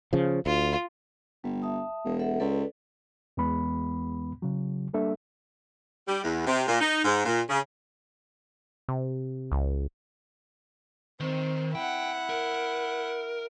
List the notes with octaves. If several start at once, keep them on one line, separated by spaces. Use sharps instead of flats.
C#3 F3
D2 F4
G1 G3
E5 A5 D#6
E1
A4 E5 F#5
C#2 A4 B4 D5
E2 E3 G#3 B3 B5
C#3 F#3
G3 A#3 D4 A4 E5
G3
E2
C3
A#2
D#4
G#2
A#2
C#3
C3
C#2
D#3 C4
E4 F#5 G5
A#4